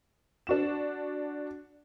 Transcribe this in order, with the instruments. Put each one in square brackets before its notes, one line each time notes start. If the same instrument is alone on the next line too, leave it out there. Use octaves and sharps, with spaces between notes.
[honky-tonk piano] D4 F#4 E7